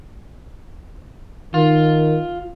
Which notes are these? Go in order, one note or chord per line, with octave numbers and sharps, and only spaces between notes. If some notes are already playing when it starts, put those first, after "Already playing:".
D#3 F4